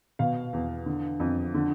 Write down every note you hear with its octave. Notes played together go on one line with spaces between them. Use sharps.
B2 F5
E2
D3
F2
D3